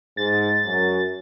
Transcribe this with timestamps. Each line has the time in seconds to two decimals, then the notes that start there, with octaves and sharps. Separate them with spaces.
0.17 G#2 A6
0.66 F#2